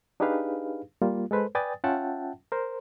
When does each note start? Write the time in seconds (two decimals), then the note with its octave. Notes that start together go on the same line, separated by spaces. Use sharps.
0.20 D4 D#4 G4 G#4 B4 F5
1.02 G3 A#3 F4
1.31 G#3 A4 B4 C5
1.55 B4 D5 G5 G#5 D#6 A6
1.84 C#4 F4 E5 F#5 G5 A5
2.52 A#4 C5